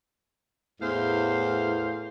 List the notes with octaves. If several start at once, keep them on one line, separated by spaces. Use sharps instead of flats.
E2 A2 C5 F5